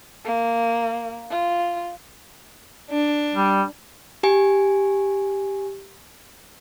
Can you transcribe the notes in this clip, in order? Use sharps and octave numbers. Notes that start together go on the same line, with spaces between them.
A#3
F4
D4
G3
G4 G#5